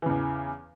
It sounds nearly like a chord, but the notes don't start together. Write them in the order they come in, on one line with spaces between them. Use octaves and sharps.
E3 C#3 E2